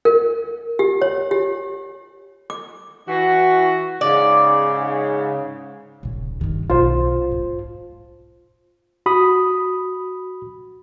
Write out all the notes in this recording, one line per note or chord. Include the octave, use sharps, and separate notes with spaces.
A#4
G4
C#5
G4
D6
E3 F#4
G#2 C#3 D5
D#1 C#3
G2 D#3
B1 F4 C5
G#2
F#4 B5 D#6